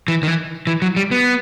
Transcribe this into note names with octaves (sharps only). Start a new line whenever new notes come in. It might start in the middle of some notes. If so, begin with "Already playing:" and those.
E3
D#3
E3
E3
F#3
G3
B3